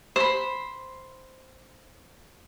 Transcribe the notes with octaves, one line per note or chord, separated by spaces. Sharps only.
C5 B5